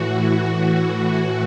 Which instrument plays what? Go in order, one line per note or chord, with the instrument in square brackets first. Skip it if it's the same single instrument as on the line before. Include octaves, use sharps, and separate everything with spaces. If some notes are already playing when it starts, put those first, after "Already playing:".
Already playing: [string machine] A2 E3 F#4